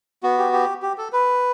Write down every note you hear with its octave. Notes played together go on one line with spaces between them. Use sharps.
B3 F#4
G4
G4
G4
A4
B4